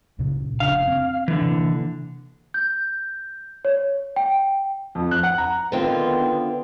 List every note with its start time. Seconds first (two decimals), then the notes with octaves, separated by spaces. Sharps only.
0.19 C#2 A#2 C#3
0.60 F1 C#3 D4 F5
0.88 C4
1.28 D3 E3
1.42 C3 A#3
2.54 G6
3.65 C#5
4.16 G5
4.95 F2
5.11 F#6
5.23 F#5
5.38 A#5
5.72 D3 D#3 B3 C4 F4
6.21 B3